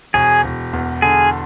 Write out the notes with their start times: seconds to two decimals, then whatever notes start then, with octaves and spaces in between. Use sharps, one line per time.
0.14 E1 G#4
0.44 E1
0.73 E2
1.02 D3 G#4